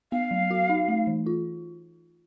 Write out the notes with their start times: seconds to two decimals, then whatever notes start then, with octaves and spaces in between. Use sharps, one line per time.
0.12 B3 F5
0.31 F#3
0.51 F#4
0.69 D#4
0.88 A3
1.07 E3
1.26 F4